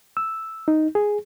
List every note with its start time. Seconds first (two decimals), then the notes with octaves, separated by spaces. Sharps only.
0.17 E6
0.68 D#4
0.95 G#4